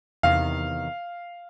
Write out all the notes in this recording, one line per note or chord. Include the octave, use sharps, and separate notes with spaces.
E2 C3 D#3 F5